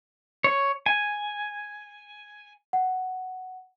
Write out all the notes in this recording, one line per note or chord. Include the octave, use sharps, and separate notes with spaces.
C#5
G#5
F#5